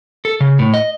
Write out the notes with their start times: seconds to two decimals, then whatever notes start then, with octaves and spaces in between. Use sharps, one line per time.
0.25 A4
0.40 C#3
0.59 A2
0.74 D#5